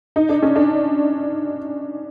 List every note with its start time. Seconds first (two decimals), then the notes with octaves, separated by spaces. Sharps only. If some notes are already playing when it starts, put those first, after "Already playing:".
0.16 D#4
0.29 D4
0.42 C#4
0.56 D4